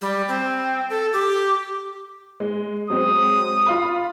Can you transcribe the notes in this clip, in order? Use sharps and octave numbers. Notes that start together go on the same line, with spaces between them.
G3
C4
A4
G4
G#3
F#3 G#3 C4 D#6
F4 F5 B5